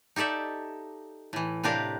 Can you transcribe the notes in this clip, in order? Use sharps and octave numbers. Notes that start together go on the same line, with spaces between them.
D#4 G4 A4 D5 E5
A2 E3
A2 C3 D4 G4 A#4 F5